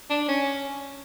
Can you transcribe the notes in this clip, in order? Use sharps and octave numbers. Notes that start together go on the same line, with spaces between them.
D4
C#4